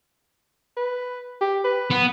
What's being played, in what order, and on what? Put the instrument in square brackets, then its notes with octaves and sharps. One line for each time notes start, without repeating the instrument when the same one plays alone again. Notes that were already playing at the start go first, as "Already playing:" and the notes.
[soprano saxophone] B4
G4
B4
[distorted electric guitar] B3